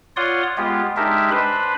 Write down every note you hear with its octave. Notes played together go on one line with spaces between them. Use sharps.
F4 C#5 D5 F#5 C6 D#6
G#3 B3 F4 G4
G#3 D4 D#4 G4 A#4 E5
D4 B4 C5 B5